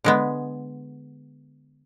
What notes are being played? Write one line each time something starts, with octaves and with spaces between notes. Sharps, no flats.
D3 G#3 B3